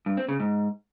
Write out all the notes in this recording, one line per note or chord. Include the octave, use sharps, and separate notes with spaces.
G2
C4
C#3
G#2